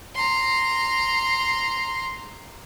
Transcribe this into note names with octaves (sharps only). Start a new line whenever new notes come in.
A#5 C6